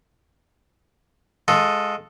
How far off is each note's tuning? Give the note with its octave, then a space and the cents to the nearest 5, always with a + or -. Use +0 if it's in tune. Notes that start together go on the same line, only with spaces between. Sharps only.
G#3 +0 F4 +30 A4 +0